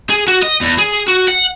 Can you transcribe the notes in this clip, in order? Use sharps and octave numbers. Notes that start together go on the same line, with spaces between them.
G#4
F#4
D#5
E2
G#4
F#4
F#5